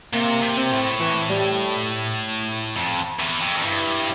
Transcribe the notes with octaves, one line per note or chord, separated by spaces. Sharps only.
C3 A#3
C3
C4
A2
E3
G3
F2
E2
F2
F2
G2 E4